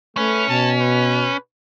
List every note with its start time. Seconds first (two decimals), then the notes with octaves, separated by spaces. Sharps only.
0.17 A3 C#4 B4
0.49 B2 A5
0.81 B4